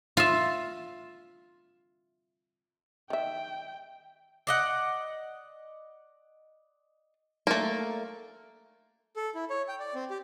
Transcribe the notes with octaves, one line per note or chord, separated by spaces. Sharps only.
F4 E5
D#3 E5 G5
D5 D#5 F#5
A3 A#3
A4
E4
C#5
G5
D5
C4
G4